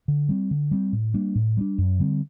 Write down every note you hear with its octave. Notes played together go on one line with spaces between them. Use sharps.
D3
G3 C4
D3
G3 C4
A2
G3 A#3 D4
A2
G3 A#3 D4
F#2
D3 G3 C4